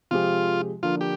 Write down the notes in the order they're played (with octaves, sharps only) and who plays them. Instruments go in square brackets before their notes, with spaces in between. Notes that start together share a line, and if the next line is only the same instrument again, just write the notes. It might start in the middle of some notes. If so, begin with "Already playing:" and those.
[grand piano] C3 F3 G#3 C4 G4 [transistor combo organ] F4
[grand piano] D3 F3 A#3 D4 [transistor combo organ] F4
[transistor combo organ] G4